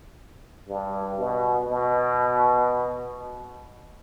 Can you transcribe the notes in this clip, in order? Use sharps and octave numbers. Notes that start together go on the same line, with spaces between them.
G2
B2
B2